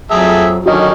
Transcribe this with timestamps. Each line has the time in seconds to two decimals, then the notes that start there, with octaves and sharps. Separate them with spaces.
0.11 F2 F#3 G#4 A4 E5
0.66 D3 D#3 F#3 C#4 D4 F#4 D#5